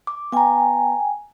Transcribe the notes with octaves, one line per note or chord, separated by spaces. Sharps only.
D6
B3 G5 G#5 A#5